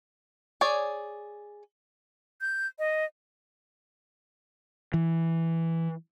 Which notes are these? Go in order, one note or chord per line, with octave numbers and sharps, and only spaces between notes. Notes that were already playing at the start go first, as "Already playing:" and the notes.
G#4 C#5 D5
G6
D#5
E3